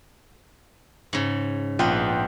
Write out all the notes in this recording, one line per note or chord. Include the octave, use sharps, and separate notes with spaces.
G#2 C#3
A#1 B3 F4 B4 G5